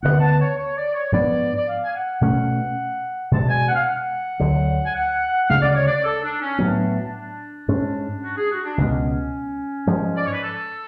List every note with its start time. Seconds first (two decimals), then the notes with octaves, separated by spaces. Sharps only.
0.03 D2 D3 G#3 B3 F#5
0.20 A5
0.39 C#5
0.57 C#5
0.76 D5
0.94 C#5
1.11 G#2 F3 B3 D4 D5
1.55 D5
1.67 F5
1.85 G#5
1.94 F#5
2.21 B2 A3 C#4
3.31 B2 G#3 D4 A5
3.48 G#5
3.68 F#5
3.75 F5
3.81 F#5
4.40 D2 D3 F#3
4.85 G#5
4.95 F#5
5.49 D2 C#3 G#3 F5
5.61 D5
5.74 C#5
5.86 D5
6.04 A4
6.23 D4
6.40 C#4
6.59 A2 F#3 B3 D4
7.68 G#2 G#3 C#4
8.22 F#4
8.36 G#4
8.51 F#4
8.64 D4
8.77 C#2 B2 G#3 C#4
9.87 G#2 F3 G#3
10.16 D5
10.25 C#5
10.33 B4
10.42 A4